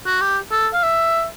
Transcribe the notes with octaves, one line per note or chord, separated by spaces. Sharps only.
F#4
G4
A4
F5
E5